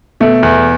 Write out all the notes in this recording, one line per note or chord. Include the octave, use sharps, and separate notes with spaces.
B2 A3
E2